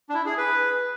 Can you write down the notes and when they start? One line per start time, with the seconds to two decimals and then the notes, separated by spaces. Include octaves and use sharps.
0.09 D4
0.14 E4
0.26 G#4
0.38 B4